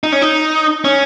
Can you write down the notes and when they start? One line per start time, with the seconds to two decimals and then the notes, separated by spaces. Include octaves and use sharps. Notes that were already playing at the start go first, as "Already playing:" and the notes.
0.03 D#4
0.12 C#4
0.22 D#4
0.85 C#4